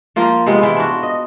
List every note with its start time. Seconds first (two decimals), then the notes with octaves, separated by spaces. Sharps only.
0.16 F3 A#3 F4
0.46 C3 G#3 B3 F4
0.62 E3 F4
0.76 D4 F4 F#4
1.03 D#5